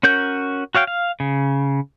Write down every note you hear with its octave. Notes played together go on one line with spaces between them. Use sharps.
C#4 F#4 A#4 G6
F#4 C#5 F5 G5
F5
C#3